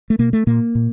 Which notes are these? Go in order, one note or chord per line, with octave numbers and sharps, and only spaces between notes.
A3
B2 A#3
A3
A#2 A#3
A#2